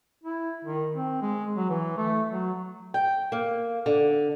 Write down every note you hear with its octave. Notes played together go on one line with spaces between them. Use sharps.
E4
D#3
C4
G#3
F#3
E3
A3
F#3
G5
A#3
D3